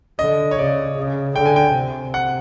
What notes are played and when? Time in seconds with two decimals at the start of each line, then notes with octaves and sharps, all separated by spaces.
0.19 D3 D#5
0.51 C#5
0.58 C#3 D5
0.97 C#3
1.36 D3 G5
1.46 G#5
1.56 G5
1.75 C3
2.14 F#5